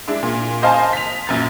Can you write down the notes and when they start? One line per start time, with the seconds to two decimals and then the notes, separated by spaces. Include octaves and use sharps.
0.08 G#3 D4 E4
0.23 A#2
0.62 C5 D#5 F5 G#5 A5 C6
0.93 B6 F7
1.27 A#1 F#2 A6